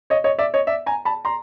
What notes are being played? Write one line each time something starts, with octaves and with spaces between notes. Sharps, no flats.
C#5 D#5
C#5 D#5
D5 E5
C#5 D#5
D5 E5
G#5 A#5
A5 B5
A#5 C6